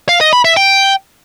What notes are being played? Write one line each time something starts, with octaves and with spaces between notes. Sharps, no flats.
F5
D#5
B5
E5
G5